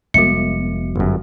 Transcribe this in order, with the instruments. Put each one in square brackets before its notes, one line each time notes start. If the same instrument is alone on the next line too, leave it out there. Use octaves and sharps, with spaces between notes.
[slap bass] F1 B3 [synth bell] G3 G#3 F#4 [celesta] C#7
[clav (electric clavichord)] G1 F#2